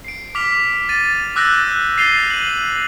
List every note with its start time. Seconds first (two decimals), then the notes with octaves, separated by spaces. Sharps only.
0.04 C7 D7
0.35 D6 F6 B6 F7
0.89 A6 D#7
1.36 D6 E6 F#6 G6 A6 A#6
1.97 A6 C7 D#7 F7 G7
2.30 D#7 F#7